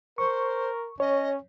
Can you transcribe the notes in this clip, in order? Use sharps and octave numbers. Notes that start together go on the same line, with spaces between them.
A#4 C5 C#6
C#4 C#5 D#5